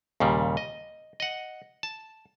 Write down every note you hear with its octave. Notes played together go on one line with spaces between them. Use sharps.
D#2 A#2 C#3 G3
D#5
D#5 F#5
A5